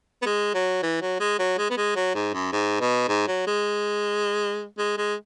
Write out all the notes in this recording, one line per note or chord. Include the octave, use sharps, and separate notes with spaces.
B3
G#3
F#3
E3
F#3
G#3
F#3
G#3
B3
G#3
F#3
G#2
F#2
G#2
B2
G#2
F#3
G#3
G#3
G#3